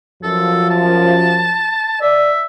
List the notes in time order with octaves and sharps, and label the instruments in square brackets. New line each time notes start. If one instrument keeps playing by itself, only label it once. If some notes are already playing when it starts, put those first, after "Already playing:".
[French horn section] F#2 F3 [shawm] A4
[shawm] A5
[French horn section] D5 [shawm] E5